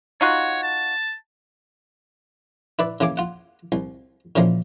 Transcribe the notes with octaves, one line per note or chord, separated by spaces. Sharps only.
D#4 F4 F#4 C#5
A5
E4 B4 D5
C#3 E3 A#3 G#5 D6
F4 F#5
C2
A#2 C#3 E3 F3 A#3